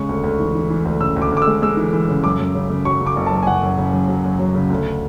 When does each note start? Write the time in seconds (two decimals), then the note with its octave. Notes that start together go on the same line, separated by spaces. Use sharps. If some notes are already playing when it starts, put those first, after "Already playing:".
Already playing: C#3 G#3 C#6
0.09 D2
0.24 D2
0.40 E3
0.55 E3
0.70 E3
0.85 D2
1.00 C#3 E6
1.16 D2
1.22 D6
1.32 D2 D6
1.42 E6
1.47 G#3
1.62 G#3 E6
1.77 E3
1.93 E3
2.08 C#3
2.24 F#2 D6
2.39 F#2
2.55 C#3
2.70 C#3
2.85 F#3 C#6
3.01 C#3
3.06 D6
3.16 F#1
3.27 A5
3.32 F#3
3.43 G#5
3.47 F#1 F#5
3.62 F#2
3.77 C#3
3.93 F#2
4.08 F#3
4.24 F#2
4.39 F#3
4.55 C#3
4.70 D2